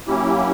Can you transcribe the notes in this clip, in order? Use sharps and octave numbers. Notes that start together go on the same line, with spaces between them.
F#3 A#3 C#4 E4 G4